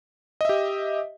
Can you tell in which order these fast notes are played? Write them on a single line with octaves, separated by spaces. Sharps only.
D#5 E5 G4